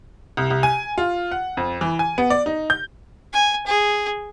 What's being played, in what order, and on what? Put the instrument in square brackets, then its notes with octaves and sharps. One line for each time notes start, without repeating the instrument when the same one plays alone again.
[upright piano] C2
C2
G#5
F4
F#5
F2
E3
G#5
B3
D5
D#4
G6
[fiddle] G#5
G#4